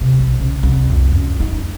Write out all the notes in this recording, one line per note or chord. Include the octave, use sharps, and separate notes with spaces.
C3
B1
C#3
C2
F2
F#2
D#4